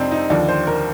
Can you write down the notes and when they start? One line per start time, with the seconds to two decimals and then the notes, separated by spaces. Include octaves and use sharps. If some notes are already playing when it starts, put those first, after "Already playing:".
Already playing: F2 C3 F3 C4 D4 D#4
0.12 D#4
0.30 D#2 D3 F3 D5
0.48 C5
0.67 A#4